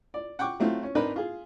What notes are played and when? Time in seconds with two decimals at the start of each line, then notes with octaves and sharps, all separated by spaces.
0.14 D5
0.39 F#5 G5 C#6 D6
0.60 F#3 A3 C4 F4
0.83 C#4
0.95 C4 D4 D#4 A#4 B4
1.16 F4 G#4